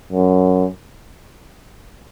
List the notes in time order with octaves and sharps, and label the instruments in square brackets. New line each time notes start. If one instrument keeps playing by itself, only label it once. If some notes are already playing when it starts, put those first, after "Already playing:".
[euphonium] F#2